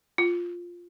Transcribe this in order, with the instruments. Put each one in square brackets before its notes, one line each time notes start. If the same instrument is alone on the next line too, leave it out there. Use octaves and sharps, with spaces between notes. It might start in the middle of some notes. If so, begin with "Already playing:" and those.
[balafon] F4